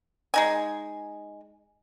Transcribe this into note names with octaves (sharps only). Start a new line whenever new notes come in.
G#3 D#4 G#5